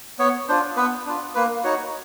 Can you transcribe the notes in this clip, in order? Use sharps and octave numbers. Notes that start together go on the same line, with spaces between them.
B3 C#5
D4 F4 C5
B3 B4
D4 F4
A#3 B4
D#4 F#4 C#5